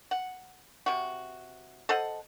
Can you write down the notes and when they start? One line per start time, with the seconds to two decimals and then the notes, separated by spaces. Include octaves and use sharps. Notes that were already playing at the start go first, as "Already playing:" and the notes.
0.11 F#5
0.86 C3 F#4
1.89 A4 C5 D#5 F#5